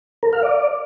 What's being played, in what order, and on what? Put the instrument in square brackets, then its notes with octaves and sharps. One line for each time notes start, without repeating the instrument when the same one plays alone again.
[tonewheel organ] A#4
F5
D5